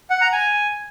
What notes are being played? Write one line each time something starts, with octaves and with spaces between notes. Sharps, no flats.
F#5
A#5
G#5